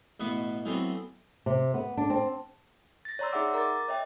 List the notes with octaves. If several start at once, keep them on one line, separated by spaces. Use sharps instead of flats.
A1 B2 B3 B4 C#6
E3 F#3 A3 B3 C4
C3
B3
D4
C4
A6 A#6
C#5 D5 A#5 C6 E6
D#4 G#4 E5 F#5 D6 E6
A#4 A#5 D6 A6
A6
C#5 D#5 E5 G5